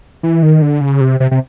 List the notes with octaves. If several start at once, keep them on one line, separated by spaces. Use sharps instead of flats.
E3
D#3
D3
C#3
C3
C3
C3